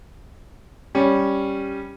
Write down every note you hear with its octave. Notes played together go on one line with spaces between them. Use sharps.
G3 C#4